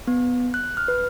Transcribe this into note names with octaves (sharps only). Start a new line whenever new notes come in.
B3
F#6
F6
B4